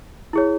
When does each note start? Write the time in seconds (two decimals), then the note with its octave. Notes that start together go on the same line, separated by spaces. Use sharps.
0.33 E4 G#4 C#5